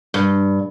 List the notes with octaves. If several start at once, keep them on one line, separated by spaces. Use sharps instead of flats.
G2